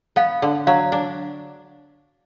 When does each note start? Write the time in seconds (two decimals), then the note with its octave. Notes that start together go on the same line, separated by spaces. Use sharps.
0.16 B3 F5
0.42 D3
0.67 F#3 F5
0.92 D4